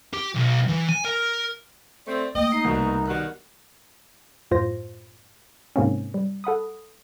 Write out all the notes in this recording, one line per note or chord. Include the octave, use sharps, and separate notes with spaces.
G4
B1
E3
G#5
A#4
A3 C4 D5
A3 A#3 D#5 G5
D#4 C7
C2 B2
B2 D#3 G3 F#5 F#6
F#2 A2 F4 C5 A#6
G#2 C3 A#3 C4 C#4
G3
A4 F#5 B5 D#6